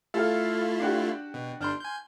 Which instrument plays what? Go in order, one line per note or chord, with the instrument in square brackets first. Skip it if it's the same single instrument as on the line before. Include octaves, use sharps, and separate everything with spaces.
[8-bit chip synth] A3 E4 F4 [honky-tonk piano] A4 F5
[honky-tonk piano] D4 F#4 G4
[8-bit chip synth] B2
[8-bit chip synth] G1 D4 G6 [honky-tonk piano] C6 F6
[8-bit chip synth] G#5 G6